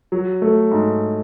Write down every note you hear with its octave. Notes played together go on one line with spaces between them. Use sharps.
F#3
A3
G#2